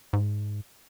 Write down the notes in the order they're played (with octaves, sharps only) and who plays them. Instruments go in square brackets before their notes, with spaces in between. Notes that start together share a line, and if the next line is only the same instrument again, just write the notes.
[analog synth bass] G#2